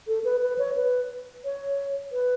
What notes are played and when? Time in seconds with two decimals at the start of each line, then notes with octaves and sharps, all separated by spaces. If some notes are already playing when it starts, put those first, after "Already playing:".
0.08 A4
0.25 B4
0.42 B4
0.59 C#5
0.77 B4
1.45 C#5
2.12 B4